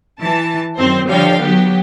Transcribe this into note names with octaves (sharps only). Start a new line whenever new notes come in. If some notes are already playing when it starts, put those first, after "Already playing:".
E3 A5
F#2 D#3 C4 C5
D3 F3 G3 C#5 F5 G5
F#3 B3 G4